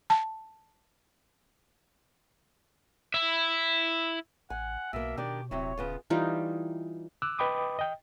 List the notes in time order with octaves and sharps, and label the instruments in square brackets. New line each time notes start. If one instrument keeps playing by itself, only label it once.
[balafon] A5
[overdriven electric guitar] E4 E5
[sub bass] A1 [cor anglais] F#5 [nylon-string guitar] G#5
[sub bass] B1 [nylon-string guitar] B2 A#3 [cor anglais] E5
[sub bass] B2 [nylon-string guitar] D#3 D4 D5 [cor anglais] G4
[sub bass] D#1 [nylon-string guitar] C3 F#3 E4 [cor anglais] C#5
[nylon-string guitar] C#3 B3 F4
[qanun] E3 G3 D#4 F4
[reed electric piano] D6 E6 F#6
B4 D#5 G5 B5 D6 D#6
D#5 G5